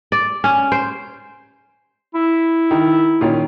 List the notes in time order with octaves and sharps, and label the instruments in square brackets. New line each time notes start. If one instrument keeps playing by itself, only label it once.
[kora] D5
C#4
C5
[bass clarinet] E4
[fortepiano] D#3
A#2 D#3 C#4